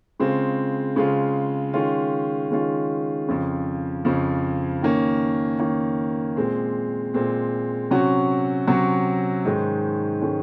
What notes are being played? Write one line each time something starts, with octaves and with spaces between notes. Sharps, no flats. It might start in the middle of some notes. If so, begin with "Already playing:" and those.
C#3 G#3 C4 F4
C#3 G#3 C4 F4
D#3 G#3 C#4 F4
D#3 G#3 C#4 F4
F2 C#3 F3
F2 C#3 F3
D#3 A#3 C#4
D#3 A#3 C#4
A#2 G#3 C4
A#2 G#3 C4
C3 F#3 C#4 F#4
C3 F#3 C#4 F#4
G#2 D#3 G#3 C#4
D#3 G#3 C#4